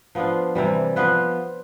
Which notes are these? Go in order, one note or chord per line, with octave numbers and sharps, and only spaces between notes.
F3 B3 D4 F4
C3 E3 G3
F3 B3 F4 B4